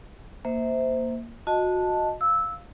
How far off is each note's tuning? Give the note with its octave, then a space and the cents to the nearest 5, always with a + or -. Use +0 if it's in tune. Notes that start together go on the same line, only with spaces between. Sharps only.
A#3 -5 C5 -15 E5 -20
F#4 -25 D#5 +0 A5 +0
F5 +0 E6 -10